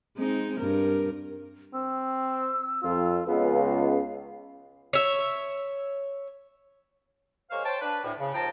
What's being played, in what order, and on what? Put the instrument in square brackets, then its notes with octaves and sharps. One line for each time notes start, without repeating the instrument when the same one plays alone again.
[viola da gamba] G#3 C4 D#4
G2 A#4
[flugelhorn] C4 [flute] E6
[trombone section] F2 [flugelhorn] F4
[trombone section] C#2 [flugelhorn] B3 [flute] F5
[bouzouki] C#5 E5
[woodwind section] G#3 A#3 C5 C#5 F5
C5 C#5 G5 A5
D4 B4
D2 A2
C#3
D#2 F3 G5 A5 A#5